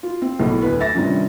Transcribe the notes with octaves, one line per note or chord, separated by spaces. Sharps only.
F4
C4
B1 A2
D2 B4
E5 A6 A#6
G2 C3 D#3 F3 C#4